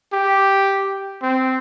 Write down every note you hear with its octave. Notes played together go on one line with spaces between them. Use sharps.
G4
C4